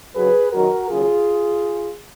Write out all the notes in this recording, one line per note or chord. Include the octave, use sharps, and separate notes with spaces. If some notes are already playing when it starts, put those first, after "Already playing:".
F#2 C#3 F#3 G#4 B4
F#2 D#3 F#3 F#4 A#4
D#2 C#3 F#3 F4 G#4